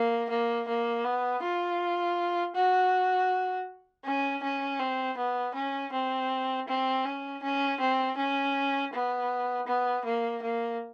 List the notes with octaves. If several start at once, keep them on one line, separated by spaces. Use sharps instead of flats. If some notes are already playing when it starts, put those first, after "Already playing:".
Already playing: A#3
A#3
A#3
B3
F4
F#4
C#4
C#4
C4
B3
C#4
C4
C4
C#4
C#4
C4
C#4
B3
B3
A#3
A#3